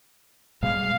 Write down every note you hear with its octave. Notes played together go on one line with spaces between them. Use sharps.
B2 G3 G#3 F5